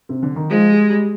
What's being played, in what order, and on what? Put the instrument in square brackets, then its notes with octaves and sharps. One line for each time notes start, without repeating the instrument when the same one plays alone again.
[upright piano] C3
D3
D#3
[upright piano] F3 [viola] G#3
[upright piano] G3
G3